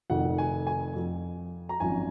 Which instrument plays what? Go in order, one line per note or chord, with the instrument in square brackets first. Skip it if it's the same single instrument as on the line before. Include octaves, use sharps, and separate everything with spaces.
[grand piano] F1 F2 D#3 F#5
G#5
G#5
F2 F3
A#5
G#1 F#2 F3 G#5